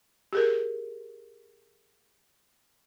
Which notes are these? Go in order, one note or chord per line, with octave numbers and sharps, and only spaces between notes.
G4 G#4 A#4